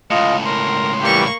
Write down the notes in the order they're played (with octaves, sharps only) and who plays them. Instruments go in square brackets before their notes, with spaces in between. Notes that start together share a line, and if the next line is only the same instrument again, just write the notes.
[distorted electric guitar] C#2 A2 [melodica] F4 D#5
[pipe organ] A#4 [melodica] C6
[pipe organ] E3 G3 G4 [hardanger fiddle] A#3 C#6